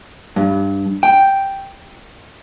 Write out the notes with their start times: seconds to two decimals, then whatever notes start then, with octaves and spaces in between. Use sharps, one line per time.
0.36 G2
1.03 G5